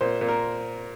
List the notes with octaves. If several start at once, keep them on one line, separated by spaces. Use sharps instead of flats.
A#2 C5
A#2
A#4